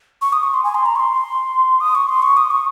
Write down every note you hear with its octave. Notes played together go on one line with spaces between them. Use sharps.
C#6
D#6
C#6
C6
G#5
C6
A#5
C#6
C6
D#6
C#6
C6
C#6
D#6
C#6